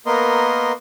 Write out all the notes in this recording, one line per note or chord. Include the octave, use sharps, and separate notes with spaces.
A#3 B3 A#4 D#5 C6